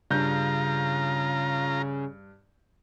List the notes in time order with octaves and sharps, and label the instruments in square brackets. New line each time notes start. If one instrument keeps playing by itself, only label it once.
[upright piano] G2 G6 [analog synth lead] C#3 [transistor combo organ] F4 A#5